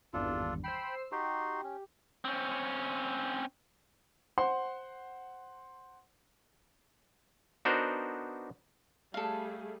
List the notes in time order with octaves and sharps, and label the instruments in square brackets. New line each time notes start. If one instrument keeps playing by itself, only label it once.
[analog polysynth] G#1 E2 G2 [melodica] D4 F4 A4
[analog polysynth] C5 E6 C7 [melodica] G5 B5
[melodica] D#4 F#4 C6 [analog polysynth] G4
[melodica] C#4
[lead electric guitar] C4 C#4
[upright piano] C5 F#5 C6
[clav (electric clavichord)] B3 D4 D#4 F#4 A#4 C5
[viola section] G3 A3 G#4 [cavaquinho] A4 F5